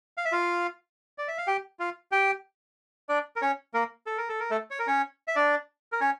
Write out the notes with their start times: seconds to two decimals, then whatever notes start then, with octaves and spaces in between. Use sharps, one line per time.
0.17 F5
0.25 E5
0.32 F4 F5
1.18 D5
1.28 E5
1.38 F5
1.47 G4 G5
1.79 F4 F5
2.12 G4 G5
3.09 D4 D5
3.36 A#4
3.42 C#4 C#5
3.74 A#3 A#4
4.06 A4
4.18 A#4
4.29 A4
4.40 A#4
4.51 A3 A4
4.71 C#5
4.79 A#4
4.87 C#4 C#5
5.28 E5
5.36 D4 D5
5.92 A#4
6.01 C#4 C#5